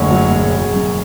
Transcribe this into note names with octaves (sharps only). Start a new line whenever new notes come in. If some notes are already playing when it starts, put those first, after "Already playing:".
Already playing: F#1 D2 D3 C#5
F#3
E1
C#3
F#2